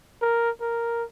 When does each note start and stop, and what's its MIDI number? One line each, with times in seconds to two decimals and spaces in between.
0.22 0.50 70
0.61 1.04 70